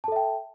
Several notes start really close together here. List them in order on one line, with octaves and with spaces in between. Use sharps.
A5 A4 E5 G5